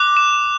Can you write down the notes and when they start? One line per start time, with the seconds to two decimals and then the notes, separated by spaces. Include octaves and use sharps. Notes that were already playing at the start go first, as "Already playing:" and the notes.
Already playing: D6 F#6
0.17 E7